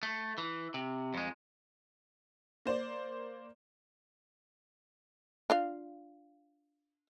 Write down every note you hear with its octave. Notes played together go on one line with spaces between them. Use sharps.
A3
E3
C3
F2 G#3
A#3 C5 D5
D4 F4 F5